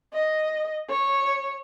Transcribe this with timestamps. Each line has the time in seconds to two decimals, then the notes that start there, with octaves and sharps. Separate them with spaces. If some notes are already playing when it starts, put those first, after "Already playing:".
0.13 D#5
0.89 C#5